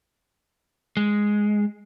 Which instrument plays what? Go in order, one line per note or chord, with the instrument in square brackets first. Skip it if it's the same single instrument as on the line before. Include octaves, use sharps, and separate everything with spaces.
[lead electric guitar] G#3